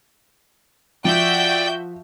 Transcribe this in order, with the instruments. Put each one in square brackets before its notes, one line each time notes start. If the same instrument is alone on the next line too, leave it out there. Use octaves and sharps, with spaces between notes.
[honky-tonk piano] F3 [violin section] F#4 E5 G6 [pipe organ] D5 [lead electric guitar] G5